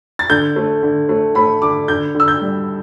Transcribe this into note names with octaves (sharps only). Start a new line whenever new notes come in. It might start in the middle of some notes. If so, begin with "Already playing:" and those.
A6
D3 G6
A3
D3
A3
A3 B5
D3 D6
D3 G6
D3
E6
G6
G3